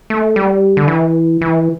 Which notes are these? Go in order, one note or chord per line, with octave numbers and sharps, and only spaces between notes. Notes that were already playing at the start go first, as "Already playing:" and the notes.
A3
G3
D3
E3
E3